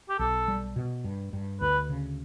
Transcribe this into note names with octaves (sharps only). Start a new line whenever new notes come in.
G4
B1 A4
G3
B2
G2
G2
D2 B4
C#3